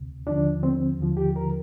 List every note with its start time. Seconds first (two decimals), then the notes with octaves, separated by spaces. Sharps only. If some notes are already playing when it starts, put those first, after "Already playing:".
Already playing: D2 C3
0.27 D#2 D3 F3 D4
0.63 C4
1.00 D#2 D3 F3
1.17 G4
1.36 A#4